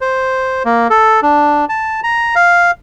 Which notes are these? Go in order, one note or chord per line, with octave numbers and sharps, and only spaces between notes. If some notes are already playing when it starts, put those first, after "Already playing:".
C5
A#3
A4
D4
A5
A#5
F5